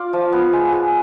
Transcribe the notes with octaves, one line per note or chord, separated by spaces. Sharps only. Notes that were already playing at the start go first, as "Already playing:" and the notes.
Already playing: F4 D5
F3
B3
G#3
G#3